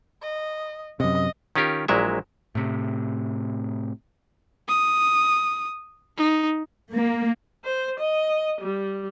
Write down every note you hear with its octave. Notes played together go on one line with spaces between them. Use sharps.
D#5
F#2 C3 D#5
D#3 C#4 F4 G4 A#4
A#1 A#2 F#3 G#3 E4 E5
A2 C3
D#6
D#4
A#3
C5
D#5
G3